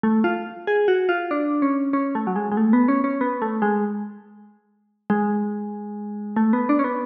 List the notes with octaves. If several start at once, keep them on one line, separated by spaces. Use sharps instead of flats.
A3
F4
G#4
F#4
F4
D4
C#4
C#4
A3
F#3
G#3
G#3
A3
B3
C#4
C#4
B3
A3
G#3
G#3
A3
B3
D4
C#4
B3